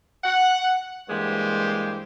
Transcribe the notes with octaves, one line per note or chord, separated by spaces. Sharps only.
F#5
G2 E3 G#3 A#3 G4 C5